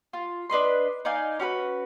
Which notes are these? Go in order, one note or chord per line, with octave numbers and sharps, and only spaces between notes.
F4
D4 B4 D#5 C6
D#4 D5 F5 G#5
C#4 F#4 A4 B4